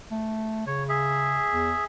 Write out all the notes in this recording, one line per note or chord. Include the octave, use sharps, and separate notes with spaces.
A3
C#3 C#5
G#4 E5
E2